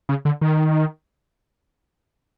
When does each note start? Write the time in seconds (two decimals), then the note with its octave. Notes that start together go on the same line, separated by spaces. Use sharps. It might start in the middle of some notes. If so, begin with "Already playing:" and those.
0.09 C#3
0.25 D3
0.41 D#3